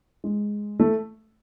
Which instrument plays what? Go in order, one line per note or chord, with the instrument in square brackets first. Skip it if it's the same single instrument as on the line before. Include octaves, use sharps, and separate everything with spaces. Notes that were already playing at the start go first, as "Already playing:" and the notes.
[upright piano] G#3
A3